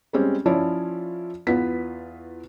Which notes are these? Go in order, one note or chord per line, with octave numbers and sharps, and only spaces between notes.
G3 G#3 C4 C#4
F3 C#4 E4 F4 C#5 D5
E2 B3 F4 B6